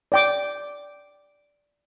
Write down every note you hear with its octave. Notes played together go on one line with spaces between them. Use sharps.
D5 G5 D6